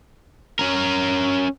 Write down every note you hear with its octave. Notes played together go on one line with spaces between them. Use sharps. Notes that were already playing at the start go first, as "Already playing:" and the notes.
C#4 A#4